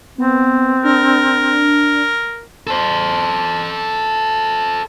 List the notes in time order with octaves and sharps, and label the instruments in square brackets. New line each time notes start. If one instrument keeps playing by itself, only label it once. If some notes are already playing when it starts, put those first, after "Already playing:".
[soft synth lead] B3 [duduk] C4
[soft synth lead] D4 [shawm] A#4
[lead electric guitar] A4 C5